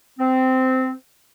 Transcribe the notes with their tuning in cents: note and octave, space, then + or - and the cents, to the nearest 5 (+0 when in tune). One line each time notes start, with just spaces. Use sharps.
C4 -15